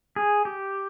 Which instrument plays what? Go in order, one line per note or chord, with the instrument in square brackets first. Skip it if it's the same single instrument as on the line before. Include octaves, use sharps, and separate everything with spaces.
[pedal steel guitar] G#4
G4